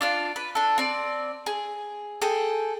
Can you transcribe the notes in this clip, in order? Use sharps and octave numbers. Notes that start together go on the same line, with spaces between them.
D4 F4 D5
B4
D4 A4
C4 D5
G#4
G#4 A4 G5